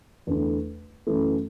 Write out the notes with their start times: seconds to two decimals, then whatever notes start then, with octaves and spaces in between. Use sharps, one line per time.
0.27 E2 D3 A3
1.07 F#2 E3 A3